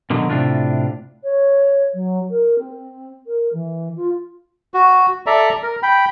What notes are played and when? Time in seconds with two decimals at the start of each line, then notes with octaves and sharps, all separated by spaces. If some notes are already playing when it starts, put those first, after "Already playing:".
0.10 B2 D3 D#3 F#3
0.30 A2 C3 D4 F4
1.23 C#5
1.94 F#3
2.30 A#4
2.59 C4
3.27 A#4
3.53 E3
3.96 F4
4.74 F#4
5.26 A4 D5 E5 A#5
5.63 A#4
5.83 G5 B5